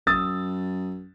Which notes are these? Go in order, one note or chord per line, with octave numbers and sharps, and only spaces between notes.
F#2 D#6 E6 A6